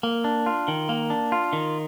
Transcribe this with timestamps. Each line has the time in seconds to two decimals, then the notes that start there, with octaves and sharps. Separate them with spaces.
0.03 A#3
0.24 D4
0.46 F4
0.68 D#3
0.89 A#3
1.10 D4
1.32 F4
1.53 D#3